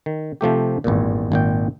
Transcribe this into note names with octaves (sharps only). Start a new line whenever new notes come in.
D#3
C3 F3 A3 G4
G#1 E2 G2 A#2
G#1 A#2 G5